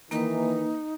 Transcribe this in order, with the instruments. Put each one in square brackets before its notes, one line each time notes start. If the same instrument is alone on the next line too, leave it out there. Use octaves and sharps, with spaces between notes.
[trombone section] D#3 E3 [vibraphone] A#3 B4 [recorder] D#4